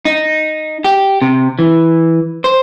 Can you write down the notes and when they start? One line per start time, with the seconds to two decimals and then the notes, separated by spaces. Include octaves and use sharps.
0.05 D#4
0.84 G4
1.22 C3
1.59 E3
2.44 C5